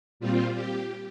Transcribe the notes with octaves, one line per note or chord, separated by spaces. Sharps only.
A#2 G3 C4 F4
G4